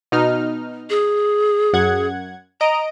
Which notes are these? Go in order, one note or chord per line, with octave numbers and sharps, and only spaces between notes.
B2 D#4 F6
G#4
F#2 F#5 G#6
D#5 A#5 D7